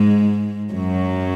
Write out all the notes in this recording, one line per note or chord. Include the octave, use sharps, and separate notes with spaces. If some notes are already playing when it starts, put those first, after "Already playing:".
Already playing: G#2 G#3
F#2 F#3